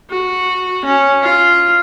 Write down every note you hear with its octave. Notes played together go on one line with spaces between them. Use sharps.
F#4
C#4
F4